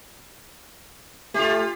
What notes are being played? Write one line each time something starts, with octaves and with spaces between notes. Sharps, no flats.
A3 F4 G4